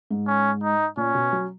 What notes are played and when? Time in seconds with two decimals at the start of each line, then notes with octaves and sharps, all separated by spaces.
0.11 G#2
0.27 C#4
0.63 D#4
0.97 A#2 C#4
1.15 B2
1.33 F#3